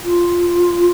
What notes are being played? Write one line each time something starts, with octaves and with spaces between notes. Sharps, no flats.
F4